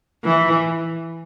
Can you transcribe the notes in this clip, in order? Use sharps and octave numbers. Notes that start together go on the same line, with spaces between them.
E3